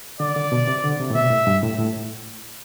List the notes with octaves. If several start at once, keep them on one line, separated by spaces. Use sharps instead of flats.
D3 D5
D3
B2
C3
D3
C3
A2
B2 E5
A2
G2
A2
A2